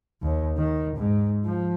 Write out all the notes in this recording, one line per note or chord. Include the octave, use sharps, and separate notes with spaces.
D#2
D#3
G#2
F3